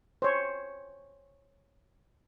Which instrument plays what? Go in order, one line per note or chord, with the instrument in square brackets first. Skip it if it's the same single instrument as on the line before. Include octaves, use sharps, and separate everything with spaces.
[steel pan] C5 C#5